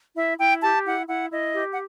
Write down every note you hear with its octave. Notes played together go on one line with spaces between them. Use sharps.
E4 E5
E4 G5
G4 A5
E4 F#5
E4 F#5
E4 D#5
G4
F#5